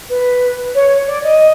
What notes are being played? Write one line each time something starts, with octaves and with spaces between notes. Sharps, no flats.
B4
C#5
D5
D#5